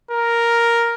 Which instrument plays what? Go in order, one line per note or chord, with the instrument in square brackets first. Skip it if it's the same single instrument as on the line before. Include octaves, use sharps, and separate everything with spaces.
[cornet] A#4